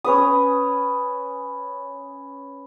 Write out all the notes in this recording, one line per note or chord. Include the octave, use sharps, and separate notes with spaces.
C#4 B4 D#6